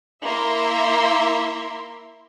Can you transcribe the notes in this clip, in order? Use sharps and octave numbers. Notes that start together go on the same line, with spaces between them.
A#3 E4 E5 A#5 C6